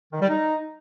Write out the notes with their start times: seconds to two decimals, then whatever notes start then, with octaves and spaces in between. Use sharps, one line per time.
0.12 D#3
0.21 G3
0.29 D#4